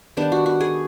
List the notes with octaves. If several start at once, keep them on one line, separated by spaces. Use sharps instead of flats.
D#3 G3 B3 D4
F#4
F#4
G#4